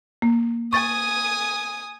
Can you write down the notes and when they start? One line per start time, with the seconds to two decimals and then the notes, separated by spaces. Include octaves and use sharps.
0.22 A#3
0.73 G#5 C#6 D#6 A6